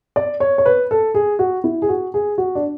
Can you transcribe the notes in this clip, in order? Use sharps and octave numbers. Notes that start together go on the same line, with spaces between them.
D5
C#5
C#5
B4
A4
G#4
F#4
E4
G#4
F#4
G#4
F#4
D4